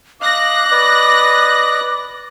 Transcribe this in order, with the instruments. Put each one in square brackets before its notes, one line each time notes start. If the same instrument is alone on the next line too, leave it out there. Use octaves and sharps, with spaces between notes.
[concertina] D#5 F5 [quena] D6 [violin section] F#6 A#6
[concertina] B4 D5 D#5